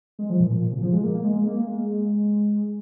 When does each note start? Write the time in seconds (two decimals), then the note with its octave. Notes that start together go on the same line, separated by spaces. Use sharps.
0.19 G#3
0.30 F3
0.40 A#2
0.50 A#2
0.62 A#2
0.72 C#3
0.82 F3
0.93 G#3
1.04 A#3
1.14 A#3
1.24 G#3
1.46 A#3
1.67 G#3